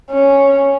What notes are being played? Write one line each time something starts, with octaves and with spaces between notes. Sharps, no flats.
C#4